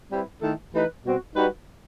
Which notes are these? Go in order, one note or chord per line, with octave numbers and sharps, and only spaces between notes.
G3 C4 E4 B4
D#3 A3 E4 A4
E3 A3 D#4 G4 B4
B2 G3 C4 F#4
G3 D#4 F#4 B4